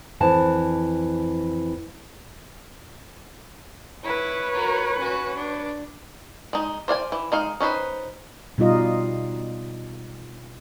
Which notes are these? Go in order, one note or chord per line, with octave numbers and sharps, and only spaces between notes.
F2 E3 A5
E4 B4 C#5
F#4 A#4
C#4 F#4
D4
G#3 D#4
C5 D5 F5 G#5
E3
G#3 D#4 F5
C#4 D#4 B4 C5
B2 G3 D#4 F4 D#5